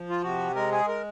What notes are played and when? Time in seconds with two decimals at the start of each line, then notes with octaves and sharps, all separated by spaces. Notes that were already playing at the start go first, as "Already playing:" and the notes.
Already playing: F3
0.10 F4
0.23 C3 F#4
0.55 G#3 A#4
0.72 G#4
0.88 A#4